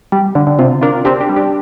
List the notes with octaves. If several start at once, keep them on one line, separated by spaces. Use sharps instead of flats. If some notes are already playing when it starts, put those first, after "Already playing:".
G3
D3
D3
C3 C4 F4
D4 F4 A#4
C4 D4 G4
D4 G4
G3
D4 G4